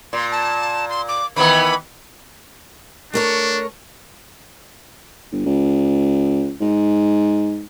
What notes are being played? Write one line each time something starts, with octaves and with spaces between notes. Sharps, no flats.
A#2 C6
A5
C6
D6
D#3 E3 B3 B5
A3 D4 A#4 C#5
G1
C#2
G#2